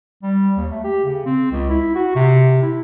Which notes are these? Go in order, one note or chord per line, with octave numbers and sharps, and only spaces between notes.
G3
D#2
A3
G4
C#3
C4
C#2
E4
F#4
C3
E4